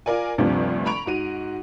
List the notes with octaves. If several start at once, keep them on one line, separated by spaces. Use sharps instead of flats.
F4 A#4 D5 G#5
G1 D2 G2 C3 F3 D5
A#5 B5 C#6 D7 F7
G#2 F#4 D#7